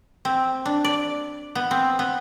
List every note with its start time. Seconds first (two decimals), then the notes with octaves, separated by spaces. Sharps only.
0.25 C4
0.65 D4
0.84 D5
1.55 B3
1.71 C4
1.99 B3